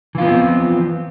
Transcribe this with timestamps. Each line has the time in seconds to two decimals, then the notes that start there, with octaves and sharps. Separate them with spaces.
0.15 E3
0.18 F4
0.21 B3
0.25 F3
0.28 C4